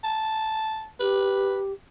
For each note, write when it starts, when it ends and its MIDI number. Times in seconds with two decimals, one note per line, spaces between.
0.04 0.89 81
1.00 1.72 67
1.00 1.59 71